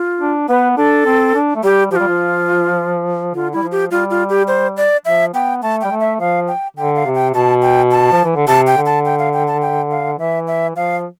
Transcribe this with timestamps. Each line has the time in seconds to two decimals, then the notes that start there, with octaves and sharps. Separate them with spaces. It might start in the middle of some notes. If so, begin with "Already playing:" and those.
Already playing: F4
0.21 D4
0.49 B3 B4
0.77 D4 A4
1.06 C4
1.35 D4
1.56 A3
1.63 G3 G4
1.91 F3 G4
1.96 G3 F4
2.08 F3
3.34 D3 F4
3.53 G3 E4
3.63 F3
3.72 G4
3.91 G3 F4
4.10 F4
4.29 G4
4.48 C5
4.77 D5
5.05 F3 E5
5.34 B3 G5
5.62 A3 A5
5.81 G3 G5
5.91 A3
6.00 E5
6.20 F3 F5
6.48 G5
6.77 D3 G5
6.95 F5
7.05 C3
7.15 G5
7.34 B2 A5
7.62 G5
7.91 A5
8.12 F3
8.24 E3
8.36 D3
8.48 C3 A5
8.67 G5
8.77 D3
8.86 A5
9.05 G5
9.19 F5
9.33 G5
9.48 A5
9.62 G5
9.91 F5
10.18 E3 E5
10.47 E5
10.76 F3 F5